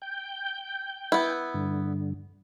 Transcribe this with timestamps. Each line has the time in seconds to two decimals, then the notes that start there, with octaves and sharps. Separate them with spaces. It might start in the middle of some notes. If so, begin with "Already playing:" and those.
0.02 G5 G6
1.12 B3 E4
1.54 G2 D3